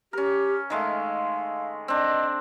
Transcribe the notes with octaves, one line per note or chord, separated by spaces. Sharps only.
C#4 G4 A#4
D#3 G#3 A3 F5
C4 D4 D#5